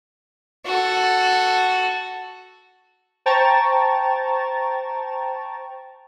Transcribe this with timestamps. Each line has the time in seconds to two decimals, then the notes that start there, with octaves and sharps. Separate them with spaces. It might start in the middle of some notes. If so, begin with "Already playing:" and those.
0.66 F#4 A4
3.26 C5 G5 A5 A#5 C#6 A6